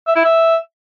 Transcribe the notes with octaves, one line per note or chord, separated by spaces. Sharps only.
E5
E4
E5